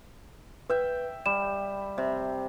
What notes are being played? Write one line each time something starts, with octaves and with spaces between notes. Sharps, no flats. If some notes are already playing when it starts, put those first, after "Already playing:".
B4 E5 G5
G3 E7
C3